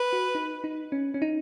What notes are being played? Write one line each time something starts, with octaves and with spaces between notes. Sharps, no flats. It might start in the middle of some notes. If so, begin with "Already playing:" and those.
Already playing: B4
F#4
D#4
D#4
C#4
C#4
D#4